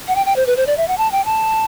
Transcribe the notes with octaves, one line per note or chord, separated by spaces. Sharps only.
F#5
G5
G5
C5
B4
C5
D5
E5
F#5
A5
G5
A5